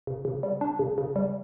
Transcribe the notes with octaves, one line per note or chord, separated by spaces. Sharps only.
C#3
C#3
G3
D4
C#3
C#3
G3